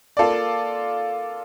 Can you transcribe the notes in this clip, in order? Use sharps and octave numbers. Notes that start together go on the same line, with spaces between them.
A#3 F4 A4 D5